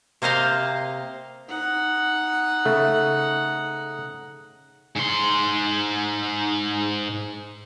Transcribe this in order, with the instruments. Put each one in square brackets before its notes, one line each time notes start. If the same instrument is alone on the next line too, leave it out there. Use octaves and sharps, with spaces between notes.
[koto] C3 A#3 C5 D#5 F5
[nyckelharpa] D#4 F#5
[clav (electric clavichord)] C#3 A3
[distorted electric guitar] G#2 C6